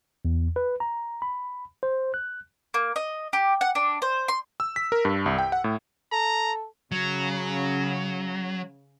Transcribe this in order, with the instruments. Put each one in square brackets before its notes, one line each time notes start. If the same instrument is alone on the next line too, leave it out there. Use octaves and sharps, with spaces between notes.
[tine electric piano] E2
B4
A#5
B5
C5
F#6
[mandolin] A#3
D#5
G4
F#5
D4
C5
C6
[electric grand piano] E6
B6
A#4
G2
C2
G5
F#5
A2
[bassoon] A4 [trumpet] A#5
[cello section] C#3 [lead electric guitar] F#3